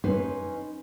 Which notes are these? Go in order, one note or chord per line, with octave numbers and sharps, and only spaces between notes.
C#4 D#4 B4 C5